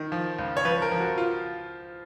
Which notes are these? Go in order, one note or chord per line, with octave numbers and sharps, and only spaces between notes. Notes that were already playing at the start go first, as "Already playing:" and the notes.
Already playing: D#3
F3
C#2
C#5
F3 B4
A#4
F3
F#4
F4